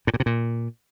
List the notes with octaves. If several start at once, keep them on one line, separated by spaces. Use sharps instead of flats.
A2
A#2
C3
A#2